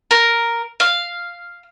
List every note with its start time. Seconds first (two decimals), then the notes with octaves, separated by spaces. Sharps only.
0.11 A#4
0.80 F5